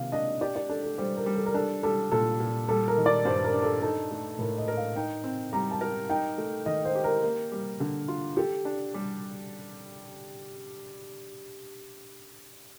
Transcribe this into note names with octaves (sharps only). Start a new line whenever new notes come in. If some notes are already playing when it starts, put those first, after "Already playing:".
Already playing: C3 D#3 A#3 F5
D4 D#5
G4 D5
D5
D4 A4
A4
G3 C5
A#4
G3
A4
A#4
D4 A4
G3 A4
A#2 A4
A#2
G3 A4
A#4
D#3
D5
G2 C5
A#4
D4
A4
D#4 A4
A3
A2 A#4
D#5
A#4
F5
D#4 G5
C4
G3 A#5
A5
A#4
D#4 G5
A3
D#3 D#5
C5
G4
A#4
A#3
G3
D3
F4
G4 A4
D4
G3